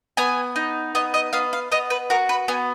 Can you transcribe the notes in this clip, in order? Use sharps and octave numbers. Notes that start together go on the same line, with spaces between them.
B3 G#5
D#4
B3 D#5
D#5
B3 F5
F5
B3 D#5
B4
F#4 A#4
B4
B3 G#5